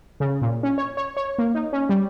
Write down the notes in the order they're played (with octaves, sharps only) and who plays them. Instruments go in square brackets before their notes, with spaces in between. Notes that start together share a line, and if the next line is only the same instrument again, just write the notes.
[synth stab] C#3
A#2
C#4
C#5
C#5
C#5
A#3
D#4
C#4
G3